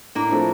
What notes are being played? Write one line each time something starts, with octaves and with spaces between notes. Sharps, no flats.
A2 A#3 D4
F3 A3 C4